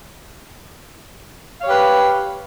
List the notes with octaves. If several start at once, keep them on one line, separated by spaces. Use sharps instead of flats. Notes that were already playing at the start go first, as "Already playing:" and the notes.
G4 B4 C#5 F5